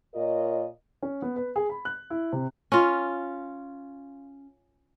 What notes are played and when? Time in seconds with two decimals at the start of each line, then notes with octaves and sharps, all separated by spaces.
0.14 A#2 F4 A#4 C#5 D#5
1.02 C#4
1.22 B3
1.36 B4
1.56 G#4
1.70 B5
1.85 F#6
2.10 E4
2.33 C3
2.72 C#4 F4